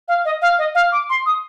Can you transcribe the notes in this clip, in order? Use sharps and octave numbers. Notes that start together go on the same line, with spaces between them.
F5
D#5
F5
D#5
F5
D6
C6
D#6